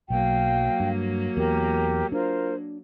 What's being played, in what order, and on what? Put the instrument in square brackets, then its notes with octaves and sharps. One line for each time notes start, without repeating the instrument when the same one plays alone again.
[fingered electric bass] B1 [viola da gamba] F#3 A#3 [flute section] F5 G5
[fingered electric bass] G2
[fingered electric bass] E2 [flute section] G4 A#4
[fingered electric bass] D4 [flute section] F4 A#4 C5